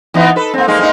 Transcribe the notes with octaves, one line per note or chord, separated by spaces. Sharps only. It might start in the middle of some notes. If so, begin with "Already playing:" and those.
E3 B3 D#4
A4 B4
A#3 C4
G#3 A#3 D#4
G#3 A#3 D#4